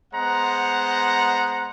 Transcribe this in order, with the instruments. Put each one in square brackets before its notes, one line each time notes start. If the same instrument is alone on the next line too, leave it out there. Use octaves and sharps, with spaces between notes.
[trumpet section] G#3 B3 C5 F#5 A#5